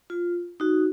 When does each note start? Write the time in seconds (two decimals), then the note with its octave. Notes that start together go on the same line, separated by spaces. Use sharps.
0.10 F4
0.60 D#4 F#4